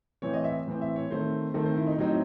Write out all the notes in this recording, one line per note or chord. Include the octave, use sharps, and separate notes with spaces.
A2 E3 C4 C#5
D#5
E5
A2 E3 C4
E5
C#5
D#3 A3 C4 C5
D#3 A3 C4 A4
C5
E4
D#4
A2 F#3 C4 D#4